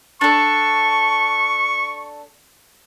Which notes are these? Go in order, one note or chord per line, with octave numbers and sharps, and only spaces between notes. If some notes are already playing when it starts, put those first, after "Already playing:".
D4 A4 C#6